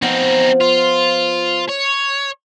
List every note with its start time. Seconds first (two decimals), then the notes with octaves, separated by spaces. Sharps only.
0.02 F3 B3 C4 D#4
0.61 F4
1.69 C#5